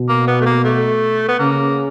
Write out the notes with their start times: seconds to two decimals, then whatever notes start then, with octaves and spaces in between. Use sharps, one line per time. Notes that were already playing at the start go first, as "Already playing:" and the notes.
Already playing: B2
0.09 A#3
0.27 B3
0.41 A3
0.46 A#3
0.64 A3
1.28 B3
1.39 C#3 A#3